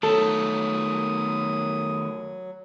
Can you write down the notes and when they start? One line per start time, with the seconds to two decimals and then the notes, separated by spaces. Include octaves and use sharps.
0.03 D#3 F#3 A3 A4 D#6